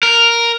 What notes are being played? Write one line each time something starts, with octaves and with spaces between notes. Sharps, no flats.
A#4